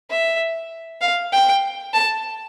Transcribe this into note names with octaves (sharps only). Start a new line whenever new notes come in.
E5
F5
G5
A5